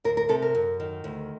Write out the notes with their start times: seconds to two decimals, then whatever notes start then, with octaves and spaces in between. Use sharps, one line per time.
0.04 D2 A#4
0.17 A#4
0.29 C3 A4
0.42 A#4
0.55 F#2
0.80 D#3
1.04 D2